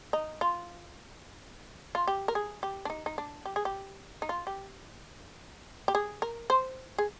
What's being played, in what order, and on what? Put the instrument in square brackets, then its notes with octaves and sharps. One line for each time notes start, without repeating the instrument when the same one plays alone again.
[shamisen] D#4
F4
F4
G4
A#4
G#4
G4
D4
D#4
D#4
D4
G4
G#4
G4
D#4
F4
G4
G4
G#4
A#4
C5
G#4